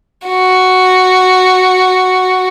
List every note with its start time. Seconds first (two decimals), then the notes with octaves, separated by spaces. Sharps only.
0.27 F#4